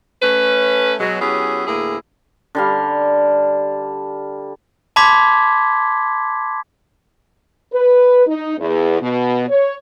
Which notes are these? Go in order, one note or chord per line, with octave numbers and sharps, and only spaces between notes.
A3 C#4 B4
B2 F#3 G#3
F#3 B3 C#4 E4 G4 G#4
D2 A2 A#3 E4 G#4
D3 G3 F5
A5 B5 C6 D6 G#6 B6
B4
D#4
E2
B2
C#5